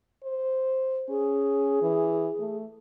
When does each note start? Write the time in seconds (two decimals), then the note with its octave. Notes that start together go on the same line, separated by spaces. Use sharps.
0.23 C5
1.09 C#4 G#4
1.82 E3
2.39 A3